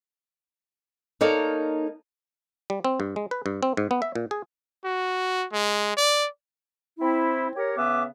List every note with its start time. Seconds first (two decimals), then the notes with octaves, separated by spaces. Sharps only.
1.21 A#3 D#4 A4 A#4 C#5 D5
2.70 G3
2.85 C4
3.00 G2
3.16 G#3
3.31 B4
3.46 G2
3.63 C4
3.77 G#2
3.91 B3
4.02 E5
4.15 A#2
4.31 G#4
4.84 F#4
5.53 G#3
5.97 D5
6.98 C4 E4
7.57 G4 A#4 C#5
7.77 C#3 B3 B4 E5 D6